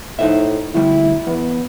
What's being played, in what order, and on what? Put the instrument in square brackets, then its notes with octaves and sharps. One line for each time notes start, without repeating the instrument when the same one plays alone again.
[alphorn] A2 [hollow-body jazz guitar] D#4 C5 E5
[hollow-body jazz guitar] D2 G3 [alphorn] E4
[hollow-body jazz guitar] E2 [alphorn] B3